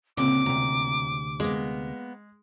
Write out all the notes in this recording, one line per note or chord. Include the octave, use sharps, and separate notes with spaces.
C#2 A#2 D3 C4 D6
D2 C3 A#5
G#3 A#3 B3